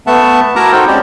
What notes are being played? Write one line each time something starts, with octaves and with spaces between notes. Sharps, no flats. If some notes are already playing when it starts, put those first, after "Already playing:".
A3 B3 E5 F#5 A5
E4 F#4 A#4 A5 A#5 D6
D#4 F#4 A4 C5 G5
G#3 C4 C#4 G4 C5 D5